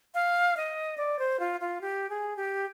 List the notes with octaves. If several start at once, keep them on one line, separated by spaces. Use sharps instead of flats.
F5
D#5
D5
C5
F4
F4
G4
G#4
G4